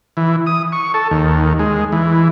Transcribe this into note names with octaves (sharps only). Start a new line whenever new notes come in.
E3
D#6
C#6
A4
D#2
G#3
E3